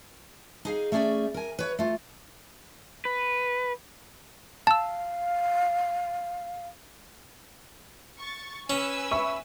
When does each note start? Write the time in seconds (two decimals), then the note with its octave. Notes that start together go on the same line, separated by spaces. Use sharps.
0.65 D#4 G#4 F5
0.92 A3 C#4 G#4 D5 E5
1.34 A#4 G#5
1.59 B4 C#5
1.79 A3 F4
3.05 B4
4.67 F5 A5 E6
8.19 C#6 A6
8.70 C#4 B4 G#5 E6
9.11 E5 B5 C#6